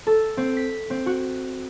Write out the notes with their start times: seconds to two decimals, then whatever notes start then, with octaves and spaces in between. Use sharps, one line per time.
0.07 A4
0.37 C4
0.57 B6
0.90 C4
1.06 F#4